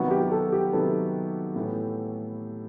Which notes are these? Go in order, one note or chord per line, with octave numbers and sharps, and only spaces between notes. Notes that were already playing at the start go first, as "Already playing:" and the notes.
Already playing: C3 D#3 F#3 B3 F#4
G4
G4
A4
G4
C3 D#3 F#3 B3 A4
A2 E3 B3